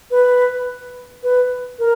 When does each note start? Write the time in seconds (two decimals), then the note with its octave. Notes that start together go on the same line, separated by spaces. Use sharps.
0.11 B4
1.23 B4
1.79 A#4